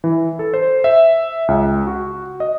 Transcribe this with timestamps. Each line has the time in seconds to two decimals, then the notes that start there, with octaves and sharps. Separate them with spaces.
0.04 E3
0.39 A4
0.54 C5
0.84 E5
1.48 C#2
1.87 F#4
2.40 D#5